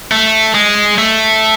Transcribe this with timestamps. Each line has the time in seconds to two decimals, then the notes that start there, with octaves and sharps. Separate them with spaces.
0.11 A3
0.54 G#3
0.98 A3